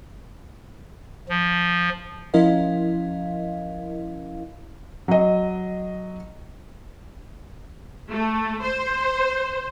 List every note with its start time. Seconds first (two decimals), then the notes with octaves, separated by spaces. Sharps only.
1.29 F3
2.34 F3 C#4 E4 A#4 D#5 F5
5.08 F#3 D#5
8.10 A3
8.63 C5